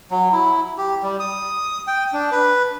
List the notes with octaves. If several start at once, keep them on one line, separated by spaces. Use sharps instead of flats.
F#3
E4
G4
G3
D#6
G5
D4
B4